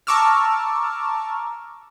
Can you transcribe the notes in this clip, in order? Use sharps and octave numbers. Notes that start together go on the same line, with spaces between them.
A5 A#5 C#6 D6 E6 F6